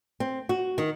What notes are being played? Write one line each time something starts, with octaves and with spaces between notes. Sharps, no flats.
C4
F#4
D#3